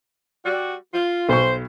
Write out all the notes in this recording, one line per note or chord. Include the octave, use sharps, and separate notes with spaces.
G3 F#4
F4
B1 C5 C#6